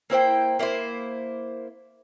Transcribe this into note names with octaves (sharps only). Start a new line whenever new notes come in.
A#3 E4 C5 G5
A#3 E4 F#4 C5